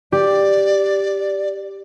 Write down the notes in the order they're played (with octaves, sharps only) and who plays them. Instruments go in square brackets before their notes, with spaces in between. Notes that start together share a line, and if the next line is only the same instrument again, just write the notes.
[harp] G4 [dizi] D5